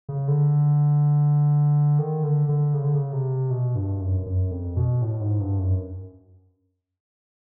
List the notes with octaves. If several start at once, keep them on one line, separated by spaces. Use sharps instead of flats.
C#3
D3
D#3
D3
D3
C#3
D3
C#3
C3
B2
G2
F#2
F#2
F2
B2
A2
G#2
G2
F#2